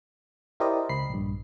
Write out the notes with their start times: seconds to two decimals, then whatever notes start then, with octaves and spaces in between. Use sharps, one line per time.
0.60 E4 G4 A#4 C5 D5 D#5
0.89 C#2 B5 C7
1.10 A#1 G2